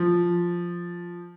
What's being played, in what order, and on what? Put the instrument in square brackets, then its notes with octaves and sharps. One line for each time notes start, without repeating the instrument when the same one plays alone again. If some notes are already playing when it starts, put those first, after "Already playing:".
Already playing: [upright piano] F3